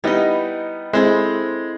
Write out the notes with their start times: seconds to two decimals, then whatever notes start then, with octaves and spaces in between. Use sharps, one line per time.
0.04 G3 B3 D#4 E4 D#5
0.93 G#3 C4 E4 A4 C5